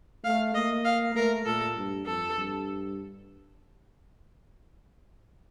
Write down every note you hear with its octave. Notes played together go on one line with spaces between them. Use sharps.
A3 F5
A#3 D#5
F5
A3 A#4
A#2 A4
G2
F2 A4
G2